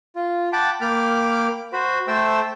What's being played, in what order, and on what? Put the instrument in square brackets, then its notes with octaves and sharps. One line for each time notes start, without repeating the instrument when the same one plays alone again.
[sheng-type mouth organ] F4
F#5 G5 A5 B5 D6
A#3 G5 B5 D6 F6
F#4 C5 B5
A3 A4 C5 E5 G5 E6